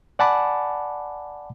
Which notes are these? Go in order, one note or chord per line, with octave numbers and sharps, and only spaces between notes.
D5 F#5 G#5 A5 B5 D6